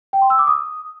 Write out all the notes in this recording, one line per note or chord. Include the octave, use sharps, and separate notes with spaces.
G5
C6
E6
D6
D#6